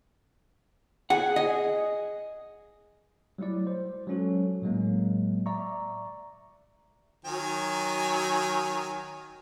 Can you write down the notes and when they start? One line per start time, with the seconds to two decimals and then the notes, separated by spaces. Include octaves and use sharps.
1.10 G#4 F#5
1.36 G#4 D#5
3.38 F#3 G3 A3 E4 D5
3.67 C5
4.07 F#3 G#3 C#4 F#4 A4
4.62 A2 F#3 G#3 A#3
5.46 D5 E5 A#5 C#6
7.25 D#3 F#3 G#5